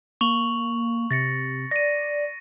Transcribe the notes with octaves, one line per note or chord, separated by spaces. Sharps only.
A#3 C#6 F7 F#7
C3 A6 A#6 C#7
D5 A#6 D#7